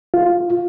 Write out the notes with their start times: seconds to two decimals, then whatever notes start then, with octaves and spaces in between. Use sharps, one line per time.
0.14 F4